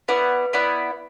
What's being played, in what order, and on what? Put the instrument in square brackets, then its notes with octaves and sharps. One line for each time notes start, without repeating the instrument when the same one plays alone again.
[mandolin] B3 E4 D5 F#5 [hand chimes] B4
[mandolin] B3 E4 D5 F#5